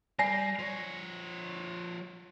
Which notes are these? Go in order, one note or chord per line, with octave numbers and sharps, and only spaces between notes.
G3 D5 G#5 A#6 C7
F3 C#5